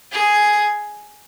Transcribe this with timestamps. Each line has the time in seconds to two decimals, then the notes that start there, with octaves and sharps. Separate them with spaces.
0.12 G#4